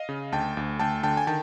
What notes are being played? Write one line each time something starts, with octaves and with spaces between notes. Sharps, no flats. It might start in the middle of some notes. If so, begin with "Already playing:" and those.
Already playing: D#5 F5
C#3
D2 G5 A5
D2
D2 G5 A5
D3 G5 A5
G#5
D#3 G5 A5